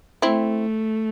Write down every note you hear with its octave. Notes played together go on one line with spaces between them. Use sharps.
A3 C4 E4